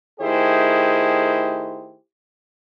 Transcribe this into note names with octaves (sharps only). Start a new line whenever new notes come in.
D#3 A3 E4 G4 G#4 C5